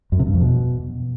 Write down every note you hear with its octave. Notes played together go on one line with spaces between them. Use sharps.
F#2
C3
G2
F2
B2